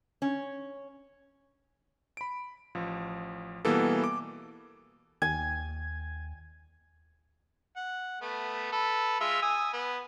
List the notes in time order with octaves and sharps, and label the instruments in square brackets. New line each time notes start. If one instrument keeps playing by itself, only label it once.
[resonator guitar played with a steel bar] C#4
[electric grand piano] B5 D7
A1 F3
B2 E3 G3 A#3 B3 A4
D6
[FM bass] D#2 [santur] G#5
[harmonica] F#5
A3 B3
A4 B4
G#3 F4 E5
G#5 D#6 E6
B3